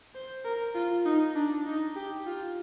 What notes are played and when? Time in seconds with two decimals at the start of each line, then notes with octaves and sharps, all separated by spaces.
0.15 C5
0.45 A#4
0.75 F4
1.06 D#4
1.36 D4
1.66 D#4
1.96 G4
2.27 F4